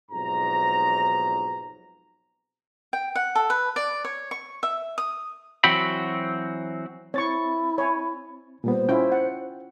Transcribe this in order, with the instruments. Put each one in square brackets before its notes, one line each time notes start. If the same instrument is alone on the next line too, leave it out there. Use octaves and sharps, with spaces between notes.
[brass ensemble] B1 F2 G#2 A#5
[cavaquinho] G5
F#5
A4
B4
D5
C#5
C#6
E5
D#6
[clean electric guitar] E3 F#3 C4 F#4 G5 B5
[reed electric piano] C4 A6 [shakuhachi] E4 [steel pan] C#5 C#6
[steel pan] C#5 G#5
[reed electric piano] A#2 G3 B3 [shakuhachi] C5
[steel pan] C#4 E4 F4 [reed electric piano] G5
[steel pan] F#5